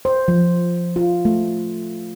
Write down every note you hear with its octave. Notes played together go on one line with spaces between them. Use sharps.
C5
F3
F4
A3